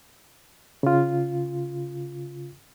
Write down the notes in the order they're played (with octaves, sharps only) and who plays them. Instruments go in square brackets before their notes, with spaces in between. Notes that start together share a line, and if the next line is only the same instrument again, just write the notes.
[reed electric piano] C#3 F4